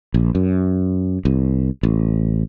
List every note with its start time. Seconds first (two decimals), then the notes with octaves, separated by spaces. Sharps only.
0.14 A#1
0.35 F#2
1.25 C2
1.83 A1